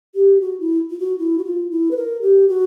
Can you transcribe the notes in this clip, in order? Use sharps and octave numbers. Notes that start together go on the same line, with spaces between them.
G4
F#4
E4
F4
F#4
E4
F#4
F4
E4
B4
A#4
G4
F#4